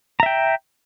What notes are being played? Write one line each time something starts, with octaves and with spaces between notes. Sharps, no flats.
E5 G5 A#5